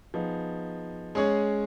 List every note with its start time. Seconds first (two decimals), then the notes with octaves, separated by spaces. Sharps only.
0.14 F3 B3 D#4 G#4
1.15 G#3 C#4 G#4 C#5